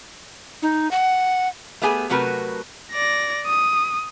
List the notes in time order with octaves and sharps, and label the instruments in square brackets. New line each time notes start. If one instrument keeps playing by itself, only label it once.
[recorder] D#4
F#5
[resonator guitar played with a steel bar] A3 B3 G4 G#4 G#5
C3 F#3 A3 F#4 A#4 B4
[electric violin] D5 A#6
D#6